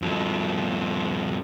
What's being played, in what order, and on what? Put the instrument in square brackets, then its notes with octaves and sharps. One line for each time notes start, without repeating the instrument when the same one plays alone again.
[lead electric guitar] G2 F3